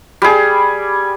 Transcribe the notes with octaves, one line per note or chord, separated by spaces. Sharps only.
G3 G#4